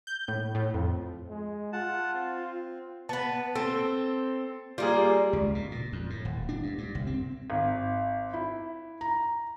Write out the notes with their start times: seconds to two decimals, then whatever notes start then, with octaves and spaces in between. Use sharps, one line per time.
0.07 G6
0.28 A2
0.55 A2
0.74 F2
1.29 G#3
1.73 F4 F#5 A5
2.14 C4
3.09 B3 B4 A5
3.55 C4 A4
4.78 G3 A#3 F4 G#4
5.33 C#2
5.55 B2
5.72 A#2
5.93 F2
6.10 A2
6.25 D#1
6.49 D4
6.63 G2
6.78 G2
6.95 C2
7.07 C4
7.50 G#1
8.34 E4
9.01 A#5